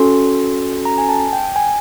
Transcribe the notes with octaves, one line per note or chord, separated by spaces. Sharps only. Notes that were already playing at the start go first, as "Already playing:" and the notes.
Already playing: C#4 F#4 A4 C6
A#5
G#5
A5
G5
G#5